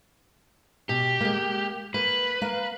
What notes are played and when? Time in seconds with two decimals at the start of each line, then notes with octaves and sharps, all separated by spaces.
0.89 B2 G4
1.21 G#3 A#3
1.94 A#3 B4
2.42 A#3 F5